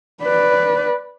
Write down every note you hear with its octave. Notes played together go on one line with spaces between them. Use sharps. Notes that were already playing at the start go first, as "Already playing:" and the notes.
B4 D5